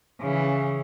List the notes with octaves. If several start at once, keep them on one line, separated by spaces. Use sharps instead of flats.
C#3 E3